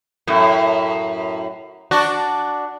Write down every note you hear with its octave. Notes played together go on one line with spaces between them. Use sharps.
F#2 A2
D4 F#4